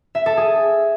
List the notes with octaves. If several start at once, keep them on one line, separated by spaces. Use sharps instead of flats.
E5
A4
G#4